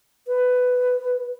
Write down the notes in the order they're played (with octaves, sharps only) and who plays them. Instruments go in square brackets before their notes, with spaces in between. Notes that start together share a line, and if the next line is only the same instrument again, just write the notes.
[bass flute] B4